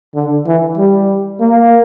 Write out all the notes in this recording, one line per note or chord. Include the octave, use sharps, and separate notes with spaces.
D3
E3
G3
A#3